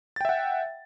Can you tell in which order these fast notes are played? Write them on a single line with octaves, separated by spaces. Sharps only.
A6 G5 E5 F#5